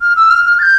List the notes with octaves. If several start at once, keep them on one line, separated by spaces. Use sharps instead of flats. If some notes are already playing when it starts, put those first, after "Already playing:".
F6
E6
F6
F6
A6
G6